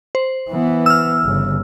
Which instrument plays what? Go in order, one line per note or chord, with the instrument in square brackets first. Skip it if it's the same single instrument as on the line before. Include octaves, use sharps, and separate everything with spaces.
[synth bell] C5
[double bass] E3 B3
[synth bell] E6 F6
[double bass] G1 C#3